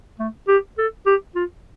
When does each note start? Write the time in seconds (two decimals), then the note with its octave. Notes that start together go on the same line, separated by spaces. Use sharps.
0.19 A3
0.48 G4
0.78 A4
1.06 G4
1.35 F4